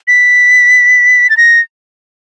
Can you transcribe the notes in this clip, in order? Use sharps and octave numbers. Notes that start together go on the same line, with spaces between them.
B6
A6
A#6